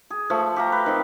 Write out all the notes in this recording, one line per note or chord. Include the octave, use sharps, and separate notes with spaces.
G#4
F3 A3
G4 F5 A#5
B4
D#3 C4